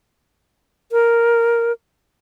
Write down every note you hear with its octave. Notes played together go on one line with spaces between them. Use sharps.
A#4